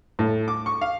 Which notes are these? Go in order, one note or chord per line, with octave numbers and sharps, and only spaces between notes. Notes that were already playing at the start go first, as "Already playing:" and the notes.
A2
D6
C#6
F5